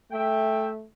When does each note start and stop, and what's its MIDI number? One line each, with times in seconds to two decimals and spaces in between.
0.12 0.86 57
0.12 0.69 76
0.12 0.69 79